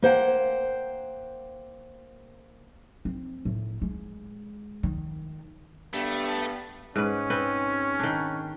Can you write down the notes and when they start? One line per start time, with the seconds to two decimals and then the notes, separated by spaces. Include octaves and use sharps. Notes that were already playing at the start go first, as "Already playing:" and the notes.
0.02 A#3 C5 F#5 G5
3.05 C4
3.45 A2
3.82 G#3
4.83 D#3
5.93 G2 A3 B3
6.96 G#2 C#4 B4
7.30 C4 B4
7.99 D#3 D4